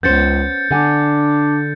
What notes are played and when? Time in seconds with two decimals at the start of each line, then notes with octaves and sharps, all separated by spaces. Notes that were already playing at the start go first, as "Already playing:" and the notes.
0.03 C#2 B3 C#4 C5 G6 A6 C#7
0.71 D3 D4 F#5 G#5